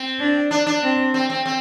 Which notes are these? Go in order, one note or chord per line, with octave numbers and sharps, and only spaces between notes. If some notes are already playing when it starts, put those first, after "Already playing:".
Already playing: C4
D4
D4
D4
C4
C4
C4
C4